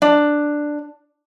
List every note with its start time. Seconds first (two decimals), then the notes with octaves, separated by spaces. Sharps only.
0.02 D4